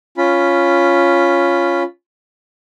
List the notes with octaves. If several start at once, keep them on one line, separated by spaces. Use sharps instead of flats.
C#4 F4 B5